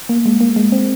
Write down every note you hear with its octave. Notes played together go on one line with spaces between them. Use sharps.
A#3
G#3
A#3
G#3
C4